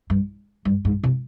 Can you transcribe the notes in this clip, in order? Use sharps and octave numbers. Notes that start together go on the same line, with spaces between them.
G2
G2
G#2
C3